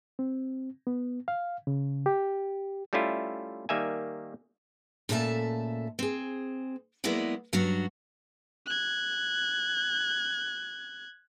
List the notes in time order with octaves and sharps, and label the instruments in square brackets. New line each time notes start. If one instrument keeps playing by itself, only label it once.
[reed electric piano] C4
B3
F5
C#3
G4
[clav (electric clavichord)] G3 A3 C#4 E4 F4
D#3 G3 A#3 E5 G#5
[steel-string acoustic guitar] A#2 C#3 A3 A4 E5 A5
C4 G#4
F#3 G#3 A#3 B3 E4 D5
G2 F#3 C#4 D4 F#4
[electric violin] F#6 G#6